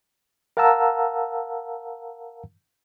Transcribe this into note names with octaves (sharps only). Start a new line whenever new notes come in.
A#4 F5 F#5 A5 A#5 E6